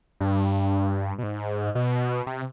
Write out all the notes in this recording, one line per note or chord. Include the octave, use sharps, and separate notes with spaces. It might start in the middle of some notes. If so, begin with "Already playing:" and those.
G2
B2
G#2
B2
C3